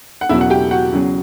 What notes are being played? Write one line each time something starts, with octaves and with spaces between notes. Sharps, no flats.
F#5
E1 E2 C#3 F#3 E4 E5
F#5
G4 G5
F#4 F#5
E2 C#3 F#3 C#4